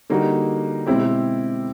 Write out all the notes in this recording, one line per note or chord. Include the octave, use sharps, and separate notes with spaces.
D3 G3 A#3 D#4 F#4
B2 G#3 C4 E4 G4